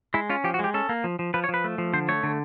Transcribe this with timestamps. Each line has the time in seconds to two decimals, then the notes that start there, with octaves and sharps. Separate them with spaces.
0.14 G#3 E4
0.30 C#4 F4
0.44 F3 G4
0.54 F#4
0.59 G#3 G4
0.74 C#4 A4
0.89 A#3
1.04 F3
1.19 F3
1.34 F3 B4
1.44 C#5
1.49 F3
1.54 B4
1.64 A3
1.78 F3
1.93 D3 C5
2.09 A3 C#5
2.23 D3